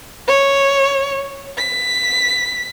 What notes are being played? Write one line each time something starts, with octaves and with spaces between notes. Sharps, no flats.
C#5
B6